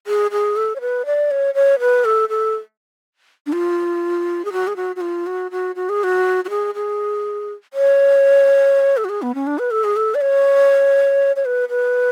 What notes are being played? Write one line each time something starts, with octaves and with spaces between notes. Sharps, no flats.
G#4
G#4
A4
C#5
B4
D5
C#5
C#5
B4
A4
A4
D4
F4
G#4
F#4
G#4
F#4
F#4
F4
F#4
F#4
F#4
G#4
F#4
F#4
G#4
G#4
C#5
A4
F#4
G#4
B3
C#4
D4
B4
A4
G#4
A4
D5
C#5
C#5
B4
B4